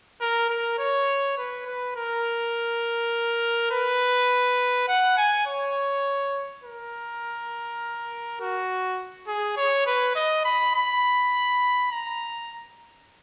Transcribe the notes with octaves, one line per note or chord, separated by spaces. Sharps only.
A#4
A#4
C#5
B4
B4
A#4
B4
F#5
G#5
C#5
A#4
F#4
G#4
C#5
B4
D#5
B5
B5
A#5